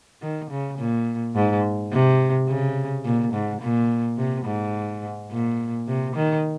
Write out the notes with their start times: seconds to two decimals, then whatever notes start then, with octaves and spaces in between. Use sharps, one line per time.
0.22 D#3
0.51 C#3
0.79 A#2
1.36 G#2
1.92 C3
2.48 C#3
3.05 A#2
3.33 G#2
3.62 A#2
4.18 C3
4.46 G#2
5.32 A#2
5.88 C3
6.16 D#3